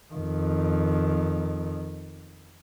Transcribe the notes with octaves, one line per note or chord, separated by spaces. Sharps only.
F2 D#3